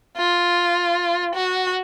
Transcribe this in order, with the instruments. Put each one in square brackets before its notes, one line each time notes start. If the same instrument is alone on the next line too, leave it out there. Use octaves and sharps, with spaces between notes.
[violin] F4
F#4